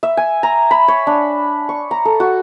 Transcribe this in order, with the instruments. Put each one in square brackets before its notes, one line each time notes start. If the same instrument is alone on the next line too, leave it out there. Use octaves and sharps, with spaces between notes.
[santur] E5
G#5
A#5
B5
C#5
D4
C#6
A#5
A4
F#4